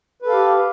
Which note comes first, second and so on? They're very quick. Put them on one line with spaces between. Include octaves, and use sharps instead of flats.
B4 A4 F5 G4